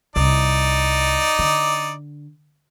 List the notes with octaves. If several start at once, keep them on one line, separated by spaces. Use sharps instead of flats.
C2 D#4 D5
D3